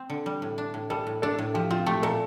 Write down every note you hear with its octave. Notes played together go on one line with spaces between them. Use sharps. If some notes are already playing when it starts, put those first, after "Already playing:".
Already playing: C4
D3
G3
A2
D4
A2
G3 A4
A2
D4 A4
A2
F3 G4
C4 F4
A3 G4
A#2 A4